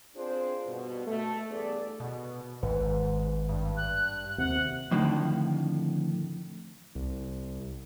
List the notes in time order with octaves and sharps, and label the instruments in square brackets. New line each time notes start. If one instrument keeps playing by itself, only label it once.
[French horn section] C4 D4 F4 G#4 C5
G2 B2
A3
E2 G2 B3 G#4 A4 D5
[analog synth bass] B2
[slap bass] G#1 [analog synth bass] G#2 [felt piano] B4
[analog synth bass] G2
[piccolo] F#6
[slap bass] D#2 [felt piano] C3 [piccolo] F#5
[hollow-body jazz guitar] F2 A2 D3 D#3
[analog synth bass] C2